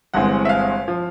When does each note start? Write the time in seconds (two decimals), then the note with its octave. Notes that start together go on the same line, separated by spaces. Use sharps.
0.14 G1 G2 E3 G#3 C4 F#5
0.45 E5
0.49 F5
0.88 F3